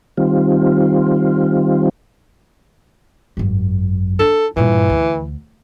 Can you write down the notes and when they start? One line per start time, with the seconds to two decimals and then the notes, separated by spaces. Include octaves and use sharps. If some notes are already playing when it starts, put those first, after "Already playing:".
0.17 D#3 G3 C4 F4
3.37 G#1 F#2
4.19 D4 A4
4.57 G2 A#2 E3
4.90 D2